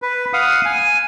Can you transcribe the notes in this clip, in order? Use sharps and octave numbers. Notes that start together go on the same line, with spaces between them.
B4
F5 F#5 D#6
G#5